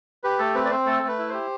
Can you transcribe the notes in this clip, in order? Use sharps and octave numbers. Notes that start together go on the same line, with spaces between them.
G4 B4
A3 A4
C4 B4
D5
C4 C5
A3 A4
A3 B4
E4
G4 C5